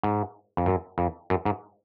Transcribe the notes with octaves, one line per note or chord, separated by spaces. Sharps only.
G#2
F2
F#2
F2
F#2
G#2